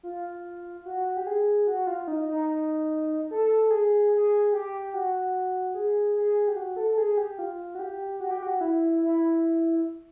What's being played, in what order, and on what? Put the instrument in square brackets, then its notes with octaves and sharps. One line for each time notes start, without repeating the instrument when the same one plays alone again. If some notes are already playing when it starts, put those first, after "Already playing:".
[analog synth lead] F4
F#4
G4
G#4
F#4
F4
D#4
D#4
A4
G#4
G#4
G4
F#4
G#4
G#4
G4
F#4
A4
A4
G#4
G4
F4
F#4
G4
F#4
G4
F#4
E4
E4